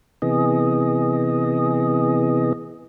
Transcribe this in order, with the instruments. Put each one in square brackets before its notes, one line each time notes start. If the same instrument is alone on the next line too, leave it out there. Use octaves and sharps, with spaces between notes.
[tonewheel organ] C3 E3 B3 G#4 D#5